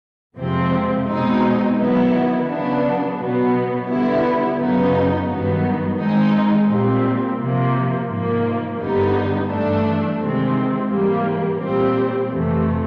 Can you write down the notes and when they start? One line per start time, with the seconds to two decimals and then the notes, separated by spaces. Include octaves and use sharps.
0.37 F2 C3 F3 G#3 C4
1.06 B2 G#3 C4 D#4
1.77 D#3 F#3 B3 E4
2.47 C#3 F#3 B3 D4
3.17 B2 F#3 B3
3.87 D3 G3 B3 E4
4.57 F#2 C#3 F#3 B3 D#4
5.27 G2 D#3 F#3 B3
5.97 D#3 G#3 C4 D#4
6.68 A#2 G3 C4
7.38 C3 F3 A#3
8.08 G#2 F3 A#3
8.78 G2 D3 G3 B3 D#4
9.48 G2 E3 A3 D4
10.18 C3 D#3 G#3 C4
10.88 G#2 E3 G3 A#3
11.58 A#2 G3 C4
12.29 F2 C3 E3 A3